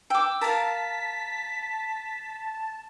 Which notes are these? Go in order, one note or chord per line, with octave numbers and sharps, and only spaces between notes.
G5 D6 E6
A#4 F5 A5 B6